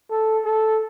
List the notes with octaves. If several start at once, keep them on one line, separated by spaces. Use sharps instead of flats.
A4
A4